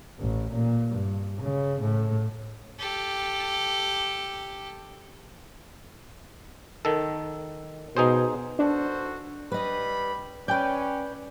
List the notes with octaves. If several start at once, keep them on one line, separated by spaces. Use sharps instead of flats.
A1
A#2
G2
C#3
A2
G4 A4
D#3 A4
B2 D#4 G#4 C5
D4 F#4 A4 C5
G3 B4 D#5 B5
C#4 B4 D5 G5 G6